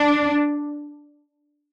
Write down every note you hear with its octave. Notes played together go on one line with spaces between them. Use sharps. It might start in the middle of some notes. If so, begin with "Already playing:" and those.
Already playing: D4